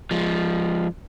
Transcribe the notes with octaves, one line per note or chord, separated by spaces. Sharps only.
F3 G#3